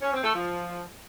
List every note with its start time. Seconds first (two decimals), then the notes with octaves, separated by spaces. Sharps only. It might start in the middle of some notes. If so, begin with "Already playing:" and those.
0.01 C#4
0.13 C4
0.24 A3
0.35 F3